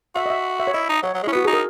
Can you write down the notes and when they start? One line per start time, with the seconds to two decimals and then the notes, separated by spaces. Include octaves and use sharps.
0.15 F#4 E5
0.26 D#5
0.30 E5
0.60 E5
0.67 C#5
0.74 E4 D#5
0.89 D#4
1.03 F#3 C#5
1.14 F#3
1.23 G#3
1.27 C#4 E4
1.32 B3 F#4
1.45 D#4 G#4
1.53 A#4